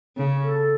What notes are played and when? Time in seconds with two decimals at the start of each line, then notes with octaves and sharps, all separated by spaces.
0.17 C#3 C#4
0.43 A4